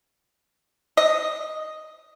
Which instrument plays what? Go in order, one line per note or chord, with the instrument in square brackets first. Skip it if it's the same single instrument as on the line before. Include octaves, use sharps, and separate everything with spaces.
[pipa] D#5